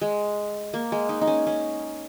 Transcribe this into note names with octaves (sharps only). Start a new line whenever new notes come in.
G#3
A#3
G#3
D#4
D#4
C#4
C#4